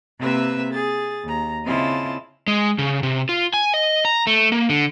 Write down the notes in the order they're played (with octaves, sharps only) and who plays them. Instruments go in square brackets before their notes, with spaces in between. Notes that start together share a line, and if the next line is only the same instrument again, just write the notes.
[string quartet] C3 A#3 C4 B4 E5 E6
G#4 A6
D#2 A#5
C#3 C4 E4 F4 D#5 A5
[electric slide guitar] G#3
C#3
C3
F4
G#5
D#5
A#5
A3
A#3
D3